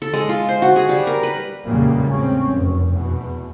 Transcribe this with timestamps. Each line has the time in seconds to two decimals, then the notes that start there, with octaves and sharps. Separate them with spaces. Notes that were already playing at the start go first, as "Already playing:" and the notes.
0.02 A4
0.13 G#3
0.29 F4
0.48 C5
0.62 F#4
0.76 G#4
0.89 G3
1.07 A#4
1.23 B4
1.65 E2 A#2 C#3 G3 G#3 A#3
2.10 A2 C4 C#4
2.51 F1 F#2
2.90 E2 B2